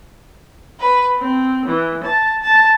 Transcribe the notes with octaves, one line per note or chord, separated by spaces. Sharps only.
B4
C4
E3
A5
A5